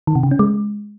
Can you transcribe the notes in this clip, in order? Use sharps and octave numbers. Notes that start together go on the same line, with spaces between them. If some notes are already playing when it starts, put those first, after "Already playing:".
D#3
C3
C#3
C#4
G#3